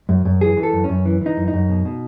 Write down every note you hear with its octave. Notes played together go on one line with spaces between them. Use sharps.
F#2
F#2
E3 G#4
E3
A4
F#2
C#4
F#2
E3
E3 D#4
F#2
D#4
F#2
B2
B2